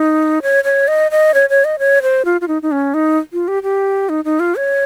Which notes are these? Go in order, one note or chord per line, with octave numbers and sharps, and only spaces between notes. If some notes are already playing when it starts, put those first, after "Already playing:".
Already playing: D#4
C#5
C#5
D#5
D#5
C#5
C#5
D#5
C#5
C5
F4
F4
D#4
D#4
C#4
D#4
F4
G4
G4
D#4
D#4
F4
C#5